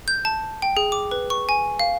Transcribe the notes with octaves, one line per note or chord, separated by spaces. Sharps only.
G6
A5
G5
G#4
D6
B4
C#6
G#5
F5